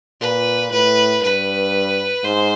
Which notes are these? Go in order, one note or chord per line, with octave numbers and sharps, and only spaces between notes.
A#2 B4
A2 B4
G2 B4
G#2 C5